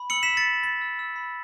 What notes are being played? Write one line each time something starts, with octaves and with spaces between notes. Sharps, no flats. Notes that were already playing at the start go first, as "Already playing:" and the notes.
Already playing: B5
E6 C#7 F#7
B6 E7
E6
A6 C#7
B5
B5 A6
E6
E6
B5